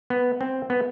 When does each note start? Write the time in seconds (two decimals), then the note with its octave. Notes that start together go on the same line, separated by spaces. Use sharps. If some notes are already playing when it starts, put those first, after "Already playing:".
0.10 B3
0.41 C4
0.70 B3